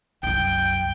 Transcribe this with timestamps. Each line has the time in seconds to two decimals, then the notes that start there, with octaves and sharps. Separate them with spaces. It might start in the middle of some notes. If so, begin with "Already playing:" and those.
0.23 C2 F#2 G5